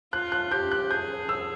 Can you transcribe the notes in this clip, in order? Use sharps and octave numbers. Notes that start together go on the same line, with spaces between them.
F4 F#6
F#6
G4 G6
F#6
G#4 G6
E6